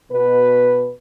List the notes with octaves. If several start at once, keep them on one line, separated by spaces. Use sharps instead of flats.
B2 B4